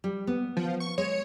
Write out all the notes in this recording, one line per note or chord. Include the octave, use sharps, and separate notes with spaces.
G3
B3
F3
C#6
G#3 C#5